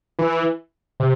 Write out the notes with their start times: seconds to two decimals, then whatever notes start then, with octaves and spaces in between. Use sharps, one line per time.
0.19 E3
1.00 C3